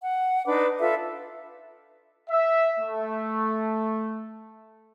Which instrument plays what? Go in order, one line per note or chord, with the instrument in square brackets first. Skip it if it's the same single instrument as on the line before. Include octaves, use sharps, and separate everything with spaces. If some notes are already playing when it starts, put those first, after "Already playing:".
[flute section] F#5
D4 D#4 B4 D6
F4 A4 B4 E5
[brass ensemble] E5
A3